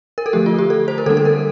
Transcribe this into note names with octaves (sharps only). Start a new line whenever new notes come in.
A#4
A4
D3 F3 A3 G4
F4
G4
A4
C5
A#4
D3 G3 A#3 D4 A4
A4
A#4